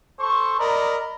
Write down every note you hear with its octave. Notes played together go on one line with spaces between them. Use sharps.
A4 C5 C#6
A#4 D5 D#5 A#5 B5